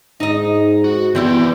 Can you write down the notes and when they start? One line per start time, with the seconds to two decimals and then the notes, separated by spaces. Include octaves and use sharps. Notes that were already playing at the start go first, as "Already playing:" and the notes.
0.20 G#2 D#4 D#5
0.84 F#4
1.15 E3 B3 C4 E4 G4 D5